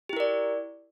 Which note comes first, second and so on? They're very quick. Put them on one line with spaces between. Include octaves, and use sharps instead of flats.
G4 E4 A#4 D5